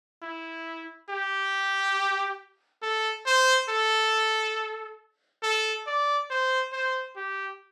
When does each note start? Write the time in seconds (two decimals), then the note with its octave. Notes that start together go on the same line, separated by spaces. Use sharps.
0.22 E4
1.10 G4
2.82 A4
3.26 C5
3.69 A4
5.43 A4
5.87 D5
6.30 C5
6.73 C5
7.16 G4